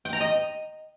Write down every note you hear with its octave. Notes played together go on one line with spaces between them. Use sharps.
G5
A#5
D#5